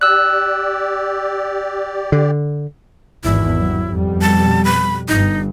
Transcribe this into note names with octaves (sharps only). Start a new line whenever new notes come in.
G4 D5 E6 F#6
D3
G#1 E2 E4
G2 F#3
F2 B2 G3
A5
B5
G1 G2 D#4